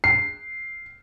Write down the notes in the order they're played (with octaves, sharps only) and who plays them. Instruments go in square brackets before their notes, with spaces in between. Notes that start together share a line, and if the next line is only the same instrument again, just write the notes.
[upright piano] C7